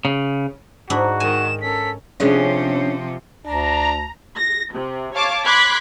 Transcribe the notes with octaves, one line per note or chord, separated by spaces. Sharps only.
C#3
G#2 D4 E4 F#4
G#2 D#3 A#4 G#5 E7
C#4 A4 A#4 B6
C3 F3 C#4 D4 G#4
D2 D4 A5 A#5
A#6
C3
C#5 F5 A5 D6
B5 C6 D6 F#6 G#6 B6